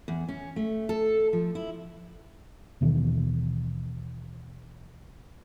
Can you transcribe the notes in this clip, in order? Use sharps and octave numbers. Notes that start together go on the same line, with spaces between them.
E2
C#4
A3
A4
F3
E4
D#2 B2 D#3 E3